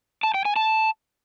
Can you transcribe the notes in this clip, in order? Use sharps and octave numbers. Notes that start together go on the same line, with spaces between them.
A5
G5
G#5
A5